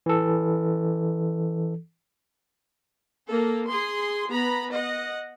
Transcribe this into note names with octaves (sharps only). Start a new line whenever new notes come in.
E3 A4
A#3 A4
G#4 C6
B3 A#5 B5
D#5 F#5